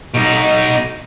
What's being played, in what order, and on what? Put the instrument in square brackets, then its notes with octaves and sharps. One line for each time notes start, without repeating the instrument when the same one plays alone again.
[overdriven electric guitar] B2 D#4